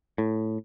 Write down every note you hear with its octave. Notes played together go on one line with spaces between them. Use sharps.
A2